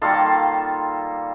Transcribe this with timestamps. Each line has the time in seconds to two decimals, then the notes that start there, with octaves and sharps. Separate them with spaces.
0.02 D#3 G3 A#3 F4 A4